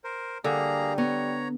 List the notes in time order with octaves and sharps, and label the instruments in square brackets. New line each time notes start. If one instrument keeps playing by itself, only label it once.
[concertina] A#4 C5
[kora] D3 [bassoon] G3 [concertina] A#3 G#4 A#5
[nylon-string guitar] B3 [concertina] C#5 A#5